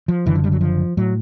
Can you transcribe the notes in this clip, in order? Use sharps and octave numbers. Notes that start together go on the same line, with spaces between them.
F3
F#1 F#2 D3 E3
F3
G3
F#3
F3
A2 F#3